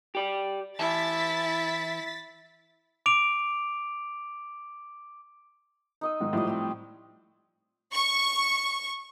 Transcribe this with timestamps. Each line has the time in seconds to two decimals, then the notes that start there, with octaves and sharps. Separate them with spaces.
0.15 G4 D5
0.79 E3 E4 E5 A5 A6 B6
3.06 D6 D7 F7
6.01 D#4 D#5 E6
6.20 G#2 D#3 G#3
6.33 A2 F3 G3 C5 D#5
6.45 C4 G4 G5
7.92 C#6